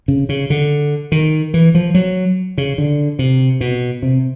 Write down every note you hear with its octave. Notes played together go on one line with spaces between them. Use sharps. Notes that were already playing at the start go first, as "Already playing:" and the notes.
C#3
C#3
D3
D#3
E3
F3
F#3
C#3
D3
C3
B2
C3